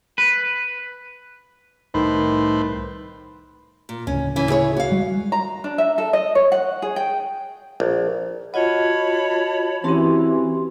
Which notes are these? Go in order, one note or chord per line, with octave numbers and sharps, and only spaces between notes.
B4
C2 A2 D#3 B4 C5
A#2
D1 C#3 C#4
E3 C#4
E4 G#4 C#5
F#4 F5
G3 G#3
A#5
D4
E5
A4
D#5
C#5
F#5
G#4
G5
A#1
F4 F#4 C#5 D#5 F#5 A5 B5
E3 C4 C#4 F#4 G4 C6